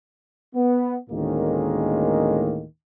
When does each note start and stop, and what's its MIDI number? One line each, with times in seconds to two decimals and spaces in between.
0.55 0.95 59
1.10 2.63 38
1.10 2.63 45
1.10 2.63 51
1.10 2.63 56
1.10 2.63 58
1.10 2.63 61